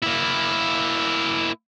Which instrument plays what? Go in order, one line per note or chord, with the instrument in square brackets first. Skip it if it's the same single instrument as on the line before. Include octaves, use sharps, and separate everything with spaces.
[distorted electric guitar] A#3 E4